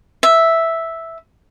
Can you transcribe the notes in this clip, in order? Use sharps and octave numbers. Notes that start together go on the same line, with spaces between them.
E5